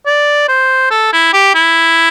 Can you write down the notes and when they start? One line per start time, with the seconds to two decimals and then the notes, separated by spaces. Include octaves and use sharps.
0.06 D5
0.48 C5
0.91 A4
1.13 E4
1.33 G4
1.55 E4